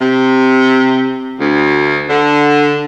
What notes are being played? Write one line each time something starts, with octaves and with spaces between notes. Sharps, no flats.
C3
D2
D3